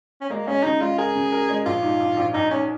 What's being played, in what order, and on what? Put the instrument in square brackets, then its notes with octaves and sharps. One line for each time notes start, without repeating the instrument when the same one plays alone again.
[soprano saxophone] C#4
[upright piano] G#3 [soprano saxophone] A#3
[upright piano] G#3 [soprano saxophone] C#4
[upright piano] C#3 [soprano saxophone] D#4
[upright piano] G#3 [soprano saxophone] F4
[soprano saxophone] G#4 [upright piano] A#4
[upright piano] C#3
A#4
G#3
[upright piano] A#1 [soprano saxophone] F4
[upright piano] G#2
A#1
A#1
[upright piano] A#1 [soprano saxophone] D#4
[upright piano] G#2 [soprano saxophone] C#4